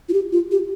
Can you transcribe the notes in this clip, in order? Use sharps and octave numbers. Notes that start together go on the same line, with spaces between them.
F4
G4
F4
G4